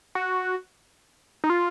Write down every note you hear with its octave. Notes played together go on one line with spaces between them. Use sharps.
F#4
D#4
F4